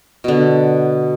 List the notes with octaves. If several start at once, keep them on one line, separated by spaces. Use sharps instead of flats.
B2 D3